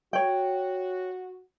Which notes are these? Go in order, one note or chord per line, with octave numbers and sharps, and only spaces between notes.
F#4 C#5 G5